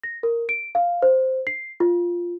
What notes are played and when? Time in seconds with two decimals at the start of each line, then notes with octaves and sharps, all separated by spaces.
0.03 A#6
0.23 A#4
0.49 D7
0.75 F5
1.02 C5
1.47 C7
1.80 F4